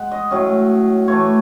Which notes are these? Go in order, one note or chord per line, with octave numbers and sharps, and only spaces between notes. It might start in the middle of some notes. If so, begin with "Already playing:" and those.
Already playing: G#3 F#5
D#5
A2 F#3 C#4
A2 E3 A3 C#5